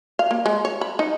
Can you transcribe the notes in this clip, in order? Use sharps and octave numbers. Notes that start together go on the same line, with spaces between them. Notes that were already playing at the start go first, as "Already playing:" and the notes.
F5
A#3
G#3
C#5
B5
D#4